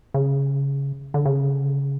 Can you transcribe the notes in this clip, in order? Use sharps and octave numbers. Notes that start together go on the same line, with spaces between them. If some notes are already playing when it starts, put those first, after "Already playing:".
C#3
D3
C#3